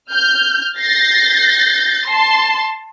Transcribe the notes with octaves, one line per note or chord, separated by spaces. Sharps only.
F6 G6
G6 A6 A#6 C7
A5 C6